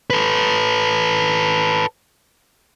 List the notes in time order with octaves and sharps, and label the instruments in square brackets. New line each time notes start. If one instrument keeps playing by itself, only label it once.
[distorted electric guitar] A4 B4